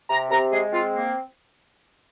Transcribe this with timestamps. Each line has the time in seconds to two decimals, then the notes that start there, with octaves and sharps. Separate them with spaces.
0.10 C3 A#5
0.31 C3 A#5
0.52 G#3 G#4
0.73 C4 F4
0.95 A#3